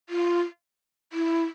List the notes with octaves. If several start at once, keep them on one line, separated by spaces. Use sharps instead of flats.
F4
E4